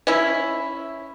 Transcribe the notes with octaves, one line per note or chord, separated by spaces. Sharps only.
C#4 E4